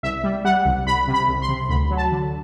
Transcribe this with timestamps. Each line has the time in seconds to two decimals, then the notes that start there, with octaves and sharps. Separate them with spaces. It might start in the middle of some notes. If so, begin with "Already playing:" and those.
0.03 C2 E5
0.24 G3
0.45 G3 F#5
0.65 C2
0.86 C2 B5
1.08 C3
1.14 B5
1.28 C2
1.42 C6
1.49 C3
1.69 D2 B5
1.90 F#3
1.97 A5
2.11 D3